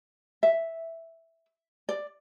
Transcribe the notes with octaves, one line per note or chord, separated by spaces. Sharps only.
E5
D5